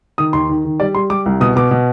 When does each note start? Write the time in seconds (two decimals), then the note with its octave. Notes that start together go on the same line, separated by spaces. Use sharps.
0.18 D#3 D#6
0.33 D#2 C6
0.49 D#3
0.65 D#3
0.80 G3 D5
0.95 G3 C6
1.10 G3 D6
1.26 C2
1.41 B2 D#6
1.56 B2 D6
1.71 B2